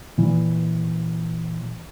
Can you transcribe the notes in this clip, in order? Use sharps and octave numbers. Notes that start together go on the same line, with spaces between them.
A#2 E3